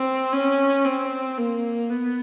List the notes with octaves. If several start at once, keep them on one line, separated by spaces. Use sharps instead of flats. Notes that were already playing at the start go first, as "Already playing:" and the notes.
Already playing: C4
C#4
C4
A#3
B3